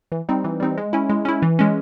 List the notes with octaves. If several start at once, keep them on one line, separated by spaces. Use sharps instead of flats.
E3
G3 C4 D#4
E3
G3 C4 D#4
G#3
C#4 E4
G#3
C#4 E4
E3
G#3 C#4